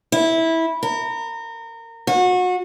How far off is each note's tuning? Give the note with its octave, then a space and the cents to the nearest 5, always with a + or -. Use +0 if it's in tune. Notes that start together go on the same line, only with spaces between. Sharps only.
E4 -15
A#4 -25
F#4 -30